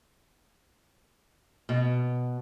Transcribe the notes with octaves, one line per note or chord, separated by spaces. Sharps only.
B2